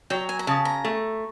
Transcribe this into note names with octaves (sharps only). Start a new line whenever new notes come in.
F#3 G5
G#5
A#5
C#3 A5
A#5
A3